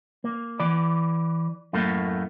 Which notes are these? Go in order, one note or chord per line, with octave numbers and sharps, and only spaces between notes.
A#3
E3 D5
F#2 A2 A3 A#3